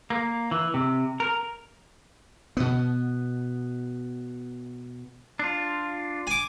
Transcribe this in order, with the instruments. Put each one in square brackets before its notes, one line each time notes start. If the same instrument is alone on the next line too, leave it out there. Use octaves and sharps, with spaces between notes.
[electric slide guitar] A#3
E3
C3
A#4
[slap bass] B2 B3
[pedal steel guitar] D4 F4
[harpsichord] G#5 D6